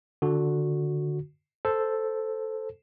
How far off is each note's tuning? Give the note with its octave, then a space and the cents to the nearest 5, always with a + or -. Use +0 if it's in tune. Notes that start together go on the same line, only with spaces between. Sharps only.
D3 +5 F#4 -15
A4 +0 C5 +0